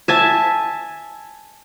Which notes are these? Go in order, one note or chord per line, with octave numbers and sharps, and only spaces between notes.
E5 G#5 A5